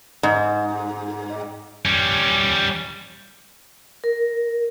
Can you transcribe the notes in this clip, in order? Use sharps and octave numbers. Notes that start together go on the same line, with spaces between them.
G#2
G3 C#4
A#4